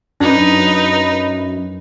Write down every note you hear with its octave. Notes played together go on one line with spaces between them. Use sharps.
F#2 D4 D#4 B4